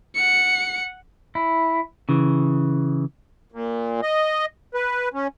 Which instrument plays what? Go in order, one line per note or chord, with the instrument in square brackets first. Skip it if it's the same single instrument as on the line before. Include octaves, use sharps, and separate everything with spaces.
[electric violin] F#5 C#7
[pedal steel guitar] E4
[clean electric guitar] C#3 E3
[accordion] A#2
D#5
B4
C#4